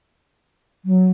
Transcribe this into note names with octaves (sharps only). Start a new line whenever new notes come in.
F#3